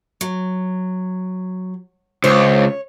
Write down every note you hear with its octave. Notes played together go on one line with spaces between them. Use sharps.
F#3
C#2 C5 C#5